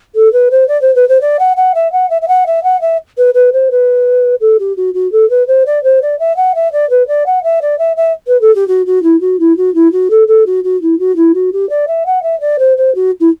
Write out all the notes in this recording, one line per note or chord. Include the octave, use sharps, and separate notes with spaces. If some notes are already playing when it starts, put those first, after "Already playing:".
A4
B4
C5
D5
C5
B4
C5
D5
F#5
F#5
E5
F#5
E5
E5
F#5
E5
F#5
E5
B4
B4
C5
B4
A4
G4
F#4
F#4
A4
B4
C5
D5
C5
D5
E5
F#5
E5
D5
B4
D5
F#5
E5
D5
E5
E5
B4
A4
G4
F#4
F#4
E4
F#4
E4
F#4
E4
F#4
A4
A4
F#4
F#4
E4
F#4
E4
F#4
G4
D5
E5
F#5
E5
D5
C5
C5
F#4
E4